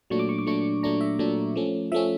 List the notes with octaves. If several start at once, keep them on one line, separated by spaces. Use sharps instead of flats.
A#2 F#3 A3 D4 C#6
D6
C#6
D6
A#2 F#3 A3 D4 C#6
A#2 F#3 A3 D4 A#5
E5
A#2 F#3 A3 D4
F3 A3 C#4
F3 A3 C#4 E5